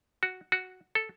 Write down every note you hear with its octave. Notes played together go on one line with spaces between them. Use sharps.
F#4
F#4
A4